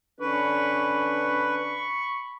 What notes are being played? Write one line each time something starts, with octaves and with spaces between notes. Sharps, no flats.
D3 C#4 D4 B4 B5 C#6